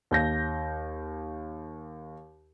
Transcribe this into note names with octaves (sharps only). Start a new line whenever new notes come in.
D#2 G6 A#6